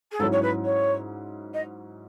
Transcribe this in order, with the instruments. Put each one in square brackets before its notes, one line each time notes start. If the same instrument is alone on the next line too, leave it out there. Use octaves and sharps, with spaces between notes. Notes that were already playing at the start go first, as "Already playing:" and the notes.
[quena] G#4
[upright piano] G#2 F#3 C#4 E4 [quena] A4
[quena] C#5
B4
C#5
D#5